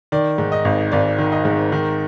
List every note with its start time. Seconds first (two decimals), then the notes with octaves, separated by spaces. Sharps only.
0.12 D#3 D5
0.38 G#2
0.52 D#5
0.65 G#1
0.92 G#1 D5
1.19 D#3
1.32 D#5
1.45 G#2
1.72 D#3